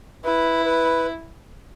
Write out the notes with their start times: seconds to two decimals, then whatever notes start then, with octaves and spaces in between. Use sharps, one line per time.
0.24 E4 B4
0.65 B4